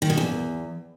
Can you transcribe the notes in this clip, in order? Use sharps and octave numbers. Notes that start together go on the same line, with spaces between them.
D#3
B2
E2